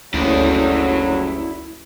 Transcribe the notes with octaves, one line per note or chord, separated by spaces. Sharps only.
F#1 D2 G2 D3 F#3 E4 D5